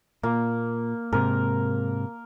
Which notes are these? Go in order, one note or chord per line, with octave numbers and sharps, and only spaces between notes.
A#2 A#3
G#2 C3 A#4